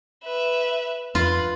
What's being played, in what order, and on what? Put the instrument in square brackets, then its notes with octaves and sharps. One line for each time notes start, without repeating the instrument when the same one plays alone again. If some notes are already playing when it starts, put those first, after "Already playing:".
[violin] B4 E5
[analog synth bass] F2 [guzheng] F4 [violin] B4